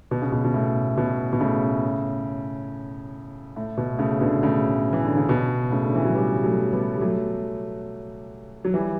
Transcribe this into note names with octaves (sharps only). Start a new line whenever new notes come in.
B2
C#3
B2
B2
A2
B2
B2
A2 C#3
A2
B2
A2 C#3
B2 D3
A2 C#3
E3
D3
C#3
B2
A2 C#3
D3
E3
F#3
E3 G3
F#3 A3
G3 B3
G3
F#3 A3
F#3
E3 G3